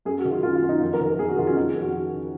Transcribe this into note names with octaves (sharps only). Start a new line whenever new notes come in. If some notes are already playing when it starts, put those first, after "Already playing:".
F#2 G#4
F#4
D#3
F4
F#2 F4
F4
F#2
D#4
F2 F4
A#4
D#3
A#4
F2 G#4
F#4
D#3 F4
C#4
F2 D#4
G#4
F2
F#4
C#3
C#3